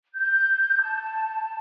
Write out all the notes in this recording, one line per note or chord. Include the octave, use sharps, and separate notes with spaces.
G6
A5